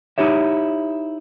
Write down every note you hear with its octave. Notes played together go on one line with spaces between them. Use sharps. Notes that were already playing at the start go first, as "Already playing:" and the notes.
D#4 E4 G4 C#5 E5